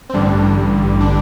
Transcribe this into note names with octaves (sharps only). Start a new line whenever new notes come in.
C4
A1 G2 D3 G3 D4
D4